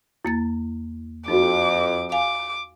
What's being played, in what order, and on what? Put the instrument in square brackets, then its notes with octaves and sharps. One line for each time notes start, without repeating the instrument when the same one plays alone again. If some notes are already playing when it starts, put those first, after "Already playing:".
[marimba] E2 A#3 A6 [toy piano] E4
[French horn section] F2 [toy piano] D#4 F4 F#4 [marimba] A4 [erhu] D6
[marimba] F5 G#5 [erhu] D6